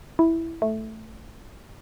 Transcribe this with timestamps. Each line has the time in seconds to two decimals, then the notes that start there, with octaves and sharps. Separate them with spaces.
0.19 E4
0.62 A3